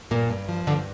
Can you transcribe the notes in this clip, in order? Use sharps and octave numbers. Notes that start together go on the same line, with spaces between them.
G2 A#2 A#3
G2
F3
G2 D3 D4